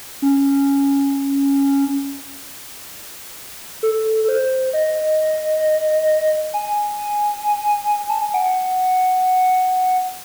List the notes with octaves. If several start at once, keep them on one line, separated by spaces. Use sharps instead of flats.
C#4
A4
A4
C5
D#5
G#5
A5
G#5
F#5